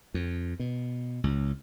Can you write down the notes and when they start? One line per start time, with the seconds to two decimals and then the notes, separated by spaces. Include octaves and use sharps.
0.14 F2
0.60 B2
1.24 C#2